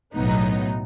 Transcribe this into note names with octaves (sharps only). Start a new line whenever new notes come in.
B1 A2 F#3 B3 D#4